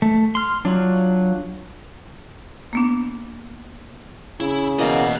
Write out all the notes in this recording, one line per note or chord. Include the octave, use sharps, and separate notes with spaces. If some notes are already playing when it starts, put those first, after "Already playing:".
A3
C6 F6
F#3 D4 F4 F#4
A#3 B3 D4
C#3 E4
B2 E3 A#3 D5 D#5 F#5